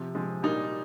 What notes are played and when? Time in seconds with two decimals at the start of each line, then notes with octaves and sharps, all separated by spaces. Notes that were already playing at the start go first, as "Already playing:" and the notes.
Already playing: C3 F3
0.15 C3 F3 G#3
0.43 A#2 G3 A#3 D#4